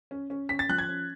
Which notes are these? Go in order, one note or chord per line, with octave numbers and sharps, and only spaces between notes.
C#4
C#4
C#4 B6
A6
F3 F#6
G#6
C#4